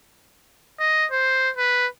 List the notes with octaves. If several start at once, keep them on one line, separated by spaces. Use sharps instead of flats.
D#5
C5
B4